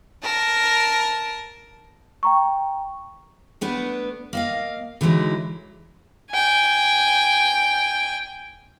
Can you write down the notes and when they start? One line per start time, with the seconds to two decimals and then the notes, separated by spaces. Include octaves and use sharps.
0.23 A#4 A5
2.23 G5 A#5 C#6
3.61 A3 B3 D4 B4
4.33 A#3 D#5 F5
5.01 D3 E3 F#3 G#3 D#4 E4
6.31 G5 G#5